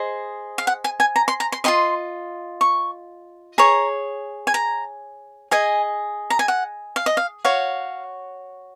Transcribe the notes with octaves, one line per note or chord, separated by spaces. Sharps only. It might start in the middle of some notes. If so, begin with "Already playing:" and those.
Already playing: G#4 C5 D#5
F5
F#5
G#5
G#5
A#5
C6
A#5
C6
F4 G#4 D#5 C6
C#6
G#4 C#5 A#5
G#5
A#5
G#4 D#5 G#5
A#5
G#5
F#5
F5
D#5
F5
F#4 C#5 F5